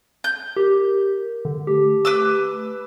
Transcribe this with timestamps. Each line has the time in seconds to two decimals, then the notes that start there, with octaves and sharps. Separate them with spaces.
0.24 G6
0.56 G4 A#4
1.45 D3
1.67 A3 G4
2.05 B4 D6 E6